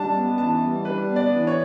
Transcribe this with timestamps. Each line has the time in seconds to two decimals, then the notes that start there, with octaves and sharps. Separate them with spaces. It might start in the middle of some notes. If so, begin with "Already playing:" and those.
Already playing: G3 D4 A5
0.14 B3
0.38 E3 A5
0.61 G3
0.85 D4 B4
1.08 B3
1.16 D5
1.32 E3
1.47 C#5